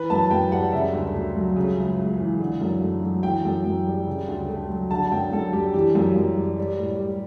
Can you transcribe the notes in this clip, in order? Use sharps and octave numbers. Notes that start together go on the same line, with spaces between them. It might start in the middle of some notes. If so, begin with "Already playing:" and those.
Already playing: E3 B4
F#2 A5
F#2 G5
G3 F#5
C#3 E5
D2
A3
F#3
C#3
C#2
C#2
E3
D3
F#2
A3
F#3
E3 G5
F#2
F#2
G3
C#3
D2
A3
F#3
D3 A5
F#2 G5
F#2 A4
G3 G4
E3 G4
F#2
F#2
G3
G3
A2
G3